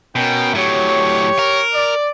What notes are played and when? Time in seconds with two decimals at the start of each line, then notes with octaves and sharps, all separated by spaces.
0.16 B2 C#4 A#4 G5
0.54 A2 F#3 G4 C#5
1.39 A#4
1.73 D5